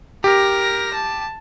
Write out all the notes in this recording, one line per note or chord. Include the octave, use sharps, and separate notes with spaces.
G4 A#4 A#6
A5